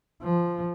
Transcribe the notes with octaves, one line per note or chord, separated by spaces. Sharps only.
F3